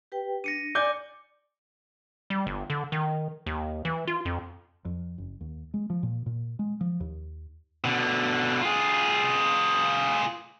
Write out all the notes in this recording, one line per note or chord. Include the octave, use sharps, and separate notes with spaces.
G4 B4 G5
D4 A#6 C#7 D#7
D5 G#5 D6 G6
G3
G1
D3
D#3
D#2
E3
F4
F2
F2
F#1
D#2
G#3
F3
A#2
A#2
G#3
F3
D#2
B2 D3
F4 G#4